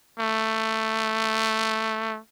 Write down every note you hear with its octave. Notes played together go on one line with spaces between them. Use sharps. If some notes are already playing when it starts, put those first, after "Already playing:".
A3